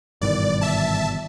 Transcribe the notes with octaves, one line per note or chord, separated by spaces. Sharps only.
G1 G#2 B2 D#3 E3 G3 D5
E5 A5